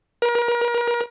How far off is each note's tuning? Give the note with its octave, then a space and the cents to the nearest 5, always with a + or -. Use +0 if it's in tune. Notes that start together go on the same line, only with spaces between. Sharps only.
A#4 +35